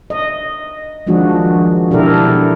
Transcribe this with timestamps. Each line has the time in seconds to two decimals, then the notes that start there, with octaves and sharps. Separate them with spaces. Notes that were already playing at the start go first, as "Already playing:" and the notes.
0.10 D#5
1.07 D#3 F3 G#3 D4 F#4
1.90 B2 D4 E4 G4 A4 A#4